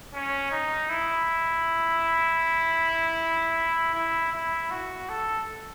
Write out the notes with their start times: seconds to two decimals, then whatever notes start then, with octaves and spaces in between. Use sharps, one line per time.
0.13 C#4
0.52 D#4
0.90 E4
3.95 E4
4.33 E4
4.70 F#4
5.09 A4